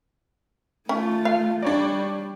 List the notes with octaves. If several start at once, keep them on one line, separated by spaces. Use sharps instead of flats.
A3 C#4 F4
F5
G3 D4 C#5 D5